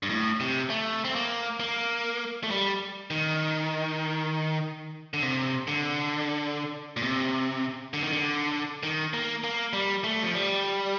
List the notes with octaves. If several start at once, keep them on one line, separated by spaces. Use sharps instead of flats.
G2
A2
C3
A3
C4
A#3
A#3
A3
G3
D#3
D3
C3
D3
A#2
C3
D3
D#3
D3
D#3
A#3
A#3
G3
A3
F3
G3